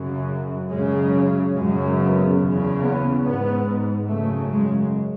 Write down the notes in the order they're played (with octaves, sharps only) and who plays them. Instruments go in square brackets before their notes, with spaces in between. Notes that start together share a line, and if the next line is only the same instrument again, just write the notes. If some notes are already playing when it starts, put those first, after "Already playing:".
Already playing: [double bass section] F#2 C#3
F#2 C#3 G#3
F#2 C#3 G#3
B3
E2 C#3
B3
G#2 B3
F#2 C#3 A3
G#3